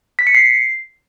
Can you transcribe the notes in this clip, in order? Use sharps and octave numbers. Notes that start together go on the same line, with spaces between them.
B6
C#7
C7